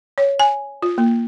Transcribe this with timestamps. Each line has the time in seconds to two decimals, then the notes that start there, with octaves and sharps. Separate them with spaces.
0.18 C#5
0.40 G#5
0.82 F4
0.98 A#3